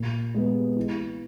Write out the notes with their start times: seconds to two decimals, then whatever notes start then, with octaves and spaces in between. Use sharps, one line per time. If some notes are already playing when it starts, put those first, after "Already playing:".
Already playing: A#2
0.34 G#3 B3
0.76 E3